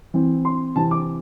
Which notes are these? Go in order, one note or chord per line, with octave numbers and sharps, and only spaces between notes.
E3 C4
C6
C3 E3 C4 A5
D6